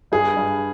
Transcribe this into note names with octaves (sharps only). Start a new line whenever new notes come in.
G2 G#4
G2